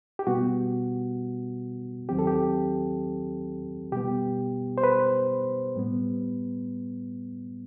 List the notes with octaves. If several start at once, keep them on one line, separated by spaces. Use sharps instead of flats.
G4
B2 G3 B3 F#4
D#2 D#3 F#3 C4 G4
A4
G4
B2 G3 B3 G4
C5
B4
A2 G3 B3